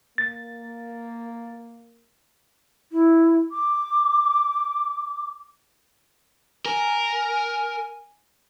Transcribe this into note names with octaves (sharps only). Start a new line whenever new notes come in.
A#3 A6
E4
D6
A#4 G#5